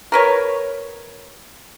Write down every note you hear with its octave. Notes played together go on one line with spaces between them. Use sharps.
A#4 B4 C#5